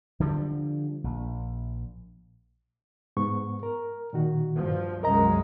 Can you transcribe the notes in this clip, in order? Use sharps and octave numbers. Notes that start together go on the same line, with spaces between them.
D3 F3 G3
A#1
G#2 B3 C#6
A#4
A#2 D#3 F#4
G2 F3
C2 F#2 G#3 A#4 D#5 A#5